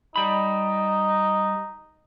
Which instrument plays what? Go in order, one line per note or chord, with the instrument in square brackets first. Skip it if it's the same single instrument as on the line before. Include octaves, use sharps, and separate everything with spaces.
[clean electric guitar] G3 B5 [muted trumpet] D#4